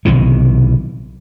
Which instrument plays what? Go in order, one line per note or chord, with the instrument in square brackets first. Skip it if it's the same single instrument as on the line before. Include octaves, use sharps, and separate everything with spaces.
[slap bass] B1 C3 D#3 E3